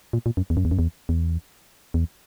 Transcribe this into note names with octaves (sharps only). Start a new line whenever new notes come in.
A#2
A#2
F#2
E2
F#2
E2
F#2
E2
E2
E2